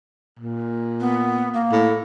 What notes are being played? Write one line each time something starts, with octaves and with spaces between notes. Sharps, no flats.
A#2
B3
A#3
A2